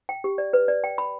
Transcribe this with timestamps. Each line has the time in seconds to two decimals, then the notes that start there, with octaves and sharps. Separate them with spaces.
0.09 G5
0.24 G4
0.38 D5
0.53 B4
0.68 D5
0.84 G5
0.98 B5